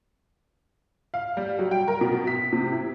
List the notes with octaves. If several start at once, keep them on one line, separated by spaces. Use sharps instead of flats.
F5
G3
F#3
G5
A#4
B2
B6
C3
E4